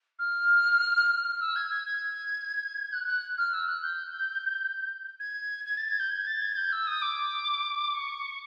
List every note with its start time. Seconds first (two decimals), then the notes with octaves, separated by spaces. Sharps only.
0.18 F6
1.24 F6
1.40 E6
1.55 G#6
1.70 G#6
1.85 G#6
2.92 F#6
3.07 F#6
3.38 F6
3.53 E6
3.68 F#6
3.83 G6
5.19 G#6
5.65 G#6
5.77 A6
5.88 G#6
5.99 G6
6.11 G#6
6.26 A6
6.41 G#6
6.56 G6
6.72 E6
6.87 D#6
7.01 D6
7.94 C#6